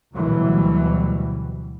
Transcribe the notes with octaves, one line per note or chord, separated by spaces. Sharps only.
D2 B2 E3 F#3 G3